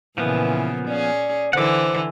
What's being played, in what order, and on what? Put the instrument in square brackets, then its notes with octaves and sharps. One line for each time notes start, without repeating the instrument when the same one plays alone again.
[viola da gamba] A#2 C#3 [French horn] E3 [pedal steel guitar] F3 B3
[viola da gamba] C#4 G#4 [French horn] D5
[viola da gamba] D3 E3 [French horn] C5 [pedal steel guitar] F#5 D6